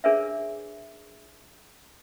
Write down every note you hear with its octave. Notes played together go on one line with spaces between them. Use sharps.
D4 G#4 A#4 B4 C#5 E5